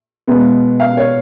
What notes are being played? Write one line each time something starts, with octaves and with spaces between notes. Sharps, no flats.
B2 G#3 B3
F5
C#5